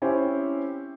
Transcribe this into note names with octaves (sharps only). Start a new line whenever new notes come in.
C4 C#4 E4 G4 C5